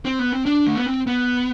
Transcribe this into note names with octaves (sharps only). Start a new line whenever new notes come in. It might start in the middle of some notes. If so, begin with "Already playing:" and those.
C4
B3
C4
D4
A3
B3
C4
B3